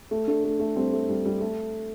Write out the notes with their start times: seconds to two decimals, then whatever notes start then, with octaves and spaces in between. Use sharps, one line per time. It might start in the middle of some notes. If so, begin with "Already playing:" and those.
0.11 A3
0.27 A3 D4
0.44 A3
0.60 A3
0.76 G3 C4
0.93 A3
1.09 G3
1.26 G3
1.41 A3